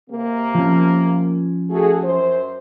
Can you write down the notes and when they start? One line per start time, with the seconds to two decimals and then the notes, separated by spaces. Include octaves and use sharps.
0.10 C3 A#3
0.55 F3 C#4
1.70 A3 F#4 G#4
2.04 F#2 C5